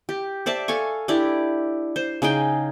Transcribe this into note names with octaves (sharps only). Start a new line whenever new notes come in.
G4
C5 D5 E5 A5
A4 F5 G#5 C#6
D4 E4 G4 D5
C5
C#3 D#4 G#4 G5